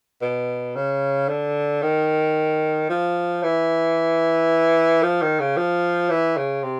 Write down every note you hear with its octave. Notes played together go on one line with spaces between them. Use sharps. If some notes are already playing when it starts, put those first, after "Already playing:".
B2
C#3
D3
D#3
F3
E3
F3
D#3
C#3
F3
E3
C#3
C3